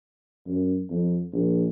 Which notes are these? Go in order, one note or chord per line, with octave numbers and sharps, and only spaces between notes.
F#2
F2
A#1